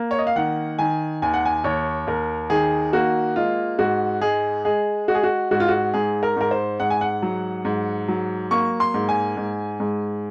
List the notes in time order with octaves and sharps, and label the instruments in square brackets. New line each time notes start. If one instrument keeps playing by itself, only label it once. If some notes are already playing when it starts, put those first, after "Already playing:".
Already playing: [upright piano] A#3
C#5
D#5
F5
D#3 F#5
D#3 G#5
D#2 G#5
F#5
G#5
D#2 C#5
D#2 A#4
D#3 G#4
A#3 F#4
G#3 F4
G#2 F#4
G#3 G#4
G#3 G#4
G#3 F#4
G#4
F#4
G#2 F#4
F4
F#4
G#2 G#4
A#4
G#2 A#4
C5
G#2 F#5
G#5
F#5
F#3
G#2
F#3
A#3 C#6
C6
G#2
G#5
G#2
G#2